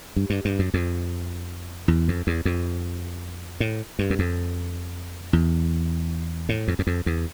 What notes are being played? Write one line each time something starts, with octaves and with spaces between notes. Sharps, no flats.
G2
G2
G2
F#2
F2
E2
F2
E2
F2
A2
G2
F#2
F2
E2
A2
F2
F#2
F2
E2